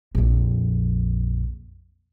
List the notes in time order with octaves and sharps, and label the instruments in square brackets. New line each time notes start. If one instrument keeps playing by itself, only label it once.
[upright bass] A#1 F2